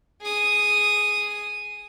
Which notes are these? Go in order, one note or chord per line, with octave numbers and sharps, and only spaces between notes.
G#4 D#6